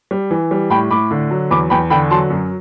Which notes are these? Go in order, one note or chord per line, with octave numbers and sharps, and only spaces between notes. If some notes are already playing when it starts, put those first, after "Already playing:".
G3
E3
G3
A2 G5 B5
A2 B5 D6
D3
F#3
E2 B5 D6
E2 G5 B5
D3 G5 B5
F#3 A5 C6
F#2